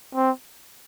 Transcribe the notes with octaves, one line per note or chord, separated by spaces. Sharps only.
C4